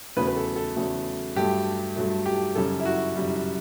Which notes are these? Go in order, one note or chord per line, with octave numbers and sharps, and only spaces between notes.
E2 C#3 F#3 A3 B4
B4
A4
A4
E2 C#3 F#3 A3
G2 F#3 A3 G4
G2 F#3 A3
G4
F#2 C#3 G3 A4
E4
F#4
F#2 C#3 G3